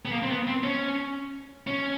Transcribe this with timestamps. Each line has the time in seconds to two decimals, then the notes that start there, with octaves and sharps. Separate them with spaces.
0.05 B3
0.12 A#3
0.22 C4
0.30 B3
0.47 C4
0.63 C#4
1.67 C#4